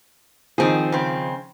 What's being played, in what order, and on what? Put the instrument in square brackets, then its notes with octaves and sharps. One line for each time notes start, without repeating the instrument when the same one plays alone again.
[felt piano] D#3 F3 [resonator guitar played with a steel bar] C4 G#4
[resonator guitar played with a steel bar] C#3 C4